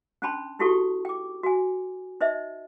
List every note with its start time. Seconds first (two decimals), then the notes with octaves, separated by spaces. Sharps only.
0.22 C#4 D4 G5 A5 B5 C6
0.59 D#4 E4 F#4 G4 A4 C#6
1.05 G5 D6
1.43 F#4 G#5
2.21 D#4 C5 D#5 E5